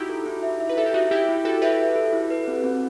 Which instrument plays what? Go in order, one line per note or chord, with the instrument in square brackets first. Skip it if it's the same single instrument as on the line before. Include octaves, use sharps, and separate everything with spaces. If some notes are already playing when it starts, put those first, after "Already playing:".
Already playing: [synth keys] D#4 E4 F#4 G4
[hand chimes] A4
E4
E5
E5
[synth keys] B4
[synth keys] A4 [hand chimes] E5
[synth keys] G4
[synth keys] D#4 F#4 [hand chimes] E5
[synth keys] E4 G4 [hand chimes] G5
[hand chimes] E4
[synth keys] F#4 A4 [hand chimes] G5
[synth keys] G4 B4 [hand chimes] E5
[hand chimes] E5
A4
E4
B4
C4
C4